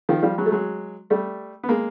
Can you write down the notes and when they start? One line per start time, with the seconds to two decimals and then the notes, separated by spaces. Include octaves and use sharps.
0.09 D#3 F3
0.23 F3 G3
0.38 F#3 G#3
0.46 A3
0.52 F#3 G#3
1.10 G3 A3
1.63 B3
1.69 G#3 A#3